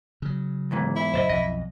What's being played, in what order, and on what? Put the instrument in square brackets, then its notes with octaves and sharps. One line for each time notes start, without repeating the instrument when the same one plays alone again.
[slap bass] C#3 F#3
[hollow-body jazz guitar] E2 G#2 E3
[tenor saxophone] E4
[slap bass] F#2 A2 C#3 [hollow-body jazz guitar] C5 D5 D#5
[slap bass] B1 F2 [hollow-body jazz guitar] D#5